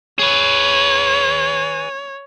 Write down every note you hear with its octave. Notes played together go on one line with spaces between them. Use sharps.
G#4 B4 C#5